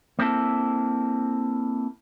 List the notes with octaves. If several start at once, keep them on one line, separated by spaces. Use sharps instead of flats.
A#3 C4 E4 A4